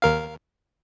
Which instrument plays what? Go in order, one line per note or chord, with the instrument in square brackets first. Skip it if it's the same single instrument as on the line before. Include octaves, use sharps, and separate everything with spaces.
[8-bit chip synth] D#2 A#4 F5